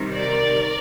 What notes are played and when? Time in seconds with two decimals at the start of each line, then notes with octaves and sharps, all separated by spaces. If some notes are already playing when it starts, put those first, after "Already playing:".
Already playing: C3 D#3 G3
0.14 A#4 D5